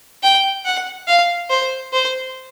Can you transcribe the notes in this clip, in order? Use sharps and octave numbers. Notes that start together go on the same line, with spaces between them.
G5
F#5
F5
C5
C5